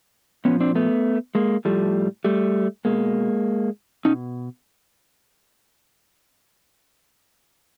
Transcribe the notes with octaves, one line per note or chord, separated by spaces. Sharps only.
A#2 F3 B3 C#4
C4 D4
A3 B3
G#3 A#3
A2 F3 G3 A3
G3 A3
B2 G#3 A#3
B2 C#4 D#4